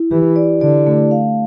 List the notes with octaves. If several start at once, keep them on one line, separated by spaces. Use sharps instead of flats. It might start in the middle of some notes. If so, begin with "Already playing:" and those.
Already playing: E4
E3 G4
D5
D3 D5
A3
F5